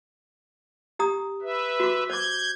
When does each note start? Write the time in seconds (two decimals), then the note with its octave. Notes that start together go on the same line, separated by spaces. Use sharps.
0.99 G4 A#5 D#6
1.42 B4 E5
1.80 F#4 D6
2.10 C5 D6 G6 G#6